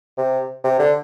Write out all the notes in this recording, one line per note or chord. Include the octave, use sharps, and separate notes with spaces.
C3
C3
D3